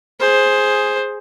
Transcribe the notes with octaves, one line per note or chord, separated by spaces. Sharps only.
G#4 C5